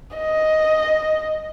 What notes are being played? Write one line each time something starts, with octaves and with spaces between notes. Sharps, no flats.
D#5